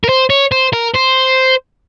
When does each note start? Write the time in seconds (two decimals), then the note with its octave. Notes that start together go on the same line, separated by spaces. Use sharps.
0.04 A#4
0.09 C5
0.30 C#5
0.52 C5
0.73 A#4
0.94 C5